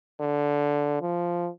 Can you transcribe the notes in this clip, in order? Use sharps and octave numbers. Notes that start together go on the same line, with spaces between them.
D3
F3